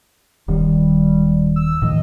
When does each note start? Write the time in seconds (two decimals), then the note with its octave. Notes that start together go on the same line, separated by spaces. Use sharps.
0.48 D#1 D#3 G3
1.56 E6
1.82 A2 D#3 F3 D#5